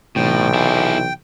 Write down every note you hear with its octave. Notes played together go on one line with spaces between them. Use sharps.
B1 A2 C3 E3 G5
E4 G#4